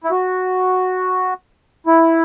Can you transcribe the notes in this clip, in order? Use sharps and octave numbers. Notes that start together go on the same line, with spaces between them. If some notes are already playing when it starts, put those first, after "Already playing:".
E4
F#4
E4